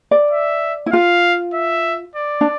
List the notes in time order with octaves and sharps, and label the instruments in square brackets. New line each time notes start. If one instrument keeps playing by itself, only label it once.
[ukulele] D5
[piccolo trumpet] E5
[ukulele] E4
[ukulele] F4 [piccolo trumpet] F5
[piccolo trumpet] E5
D5
[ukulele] D4